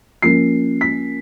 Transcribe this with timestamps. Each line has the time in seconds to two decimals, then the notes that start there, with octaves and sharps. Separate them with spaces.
0.22 F3 A#3 C#4 C7
0.81 B6